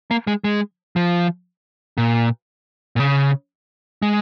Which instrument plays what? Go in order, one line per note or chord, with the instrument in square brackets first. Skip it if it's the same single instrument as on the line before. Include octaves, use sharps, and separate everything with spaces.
[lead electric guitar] A#3
G#3
G#3
F3
A#2
A#2
C#3
G#3